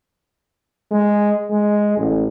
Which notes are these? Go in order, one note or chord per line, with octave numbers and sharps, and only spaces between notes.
G#3
G#3
A1